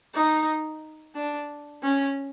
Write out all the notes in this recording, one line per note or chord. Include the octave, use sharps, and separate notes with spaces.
D#4
D4
C#4